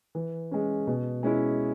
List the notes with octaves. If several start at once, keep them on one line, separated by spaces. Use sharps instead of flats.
E3
G#3 C#4
B2
G#3 C#4 E4